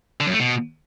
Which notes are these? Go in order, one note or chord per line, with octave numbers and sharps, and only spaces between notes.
D3
F#2
A3
B2